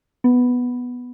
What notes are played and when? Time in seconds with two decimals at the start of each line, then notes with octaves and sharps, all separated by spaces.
0.24 B3